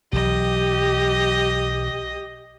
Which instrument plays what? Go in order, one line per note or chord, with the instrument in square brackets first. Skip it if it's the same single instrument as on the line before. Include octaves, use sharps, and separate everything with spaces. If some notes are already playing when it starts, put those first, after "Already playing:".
[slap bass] B1 E3 F#3 [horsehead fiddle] G4 [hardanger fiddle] D#5